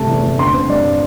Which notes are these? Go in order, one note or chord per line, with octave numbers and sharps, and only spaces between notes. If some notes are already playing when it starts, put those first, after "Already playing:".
Already playing: G1 C3 A3 A5
E2
E2
D3 C6
C4
G2 D5